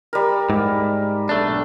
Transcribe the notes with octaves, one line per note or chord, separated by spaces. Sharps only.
G3 A#4
G#2
B1 A3 D4